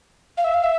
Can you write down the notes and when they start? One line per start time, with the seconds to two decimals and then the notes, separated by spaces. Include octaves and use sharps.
0.37 F5
0.44 E5
0.53 F5
0.63 E5